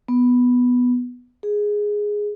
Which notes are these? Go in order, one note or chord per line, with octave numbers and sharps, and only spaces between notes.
B3
G#4